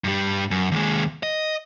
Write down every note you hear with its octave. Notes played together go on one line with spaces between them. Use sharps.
G2 G3
F#2
D#2 G#3
D#5